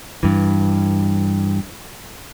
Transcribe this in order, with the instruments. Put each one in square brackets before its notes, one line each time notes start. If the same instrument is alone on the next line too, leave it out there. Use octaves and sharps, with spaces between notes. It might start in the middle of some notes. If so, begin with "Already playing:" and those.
[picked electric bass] G2 E3